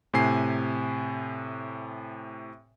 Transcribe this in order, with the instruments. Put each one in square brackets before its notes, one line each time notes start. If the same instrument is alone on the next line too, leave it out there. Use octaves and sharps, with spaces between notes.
[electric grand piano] A2 C3 G#5 C7